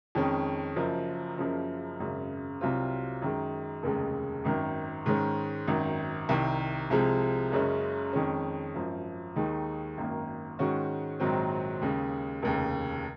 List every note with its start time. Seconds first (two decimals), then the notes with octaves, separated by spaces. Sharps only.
0.15 F2 D#3 G#3 C#4
0.76 F#1 F#2 F3
1.38 F#1 F#2 C#3 F3
2.00 G#1 F#2 C#3
2.61 C2 C3 F#3 C4 F4
3.22 F#2 D#3 G#3
3.83 F1 D#2 C#3 G#3
4.45 G#1 F#2 D#3
5.06 G#2 D#3 G#3 C#4
5.68 G#1 F#2 D#3
6.29 C2 C3 D#3
6.90 C2 C3 F3 G#3
7.52 F#1 F#2 C#3 G#3 C#4
8.13 F2 D#3 G#3 C#4
8.75 G#1 F#2 F3
9.36 D#2 D#3 G#3 D#4
9.97 G#1 F#2 D#3 A#3
10.59 G#2 D#3 G#3 C#4 F#4
11.20 A#1 G#2 D#3 F#3 C4
11.82 D#2 C#3 G#3
12.42 F1 D#2 C#3